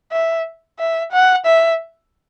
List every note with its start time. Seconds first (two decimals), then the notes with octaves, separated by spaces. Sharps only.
0.12 E5
0.79 E5
1.12 F#5
1.46 E5